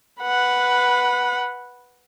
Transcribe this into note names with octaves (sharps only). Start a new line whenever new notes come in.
B4 F#5